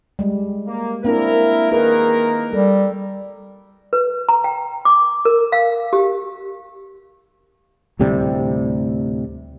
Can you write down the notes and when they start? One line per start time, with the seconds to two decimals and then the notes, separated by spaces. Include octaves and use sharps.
0.19 G3 G#3
0.67 A#3
1.04 A#3 C4 D4 E4 A#4
1.72 D#3 A#3 E4 G#4 A#4 B4
2.53 G3 A4
3.93 B4
4.29 A#5
4.44 G5
4.85 D6
5.25 A#4
5.52 F5
5.93 G4
7.99 D2 A2 C3 G3